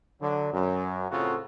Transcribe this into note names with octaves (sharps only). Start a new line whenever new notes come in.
D3 F#3
F#2
A2 C#3 C4 F4 F#4 A4